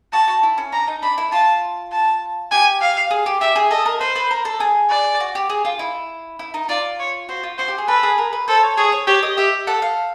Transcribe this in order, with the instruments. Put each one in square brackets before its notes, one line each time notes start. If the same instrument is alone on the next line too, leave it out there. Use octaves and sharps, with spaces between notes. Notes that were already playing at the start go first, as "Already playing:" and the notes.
[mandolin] F#4 [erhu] A5
[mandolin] F#4
E4
C#4
[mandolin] D4 [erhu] A#5
[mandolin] D#4
[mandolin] D4 [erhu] B5
[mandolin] E4
[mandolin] F4 [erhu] A5
[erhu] A5
[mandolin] G4 [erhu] G#5
[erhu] F5
[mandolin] G#4
G4
[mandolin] G4 [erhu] E5
[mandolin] G#4
[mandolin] A4 [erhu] D#5
[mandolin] A#4
[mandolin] B4 [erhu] C5
[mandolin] B4
A#4
A4
G#4
[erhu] D5
[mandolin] F#4
G4
G#4
F4
E4
E4
D#4
[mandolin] F4 [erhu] D5
[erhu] C#5
[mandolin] F#4 [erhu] C5
[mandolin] F4
[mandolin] F#4 [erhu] C5
[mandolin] G4
G#4
[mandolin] A4 [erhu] B4
[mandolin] G#4
A#4
B4
[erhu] A4 [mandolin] C5
[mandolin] C#5
[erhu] G#4 [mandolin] C#5
[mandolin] C#5
[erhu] G4 [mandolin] C#5
[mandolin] D#5
[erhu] G4 [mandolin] E5
[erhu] A4 [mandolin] F#5
[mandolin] F5